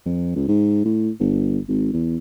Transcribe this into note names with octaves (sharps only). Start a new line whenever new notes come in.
F2
C#2
G#2
A2
G1
G#1
E2